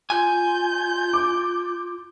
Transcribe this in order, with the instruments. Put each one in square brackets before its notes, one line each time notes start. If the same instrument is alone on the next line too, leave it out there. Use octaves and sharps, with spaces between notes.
[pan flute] F4 [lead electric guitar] G#5 [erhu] G6
[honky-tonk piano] D6